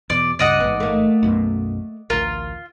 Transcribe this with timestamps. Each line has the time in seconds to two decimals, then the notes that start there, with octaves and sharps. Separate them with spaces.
0.10 E2 B2 D5
0.39 C#2 G2 C#3 D5 D#5 F#5
0.60 A1 G#2 B3
0.80 A3 A#3
1.23 B1 F#2 B2
2.10 A1 D2 F4 A#4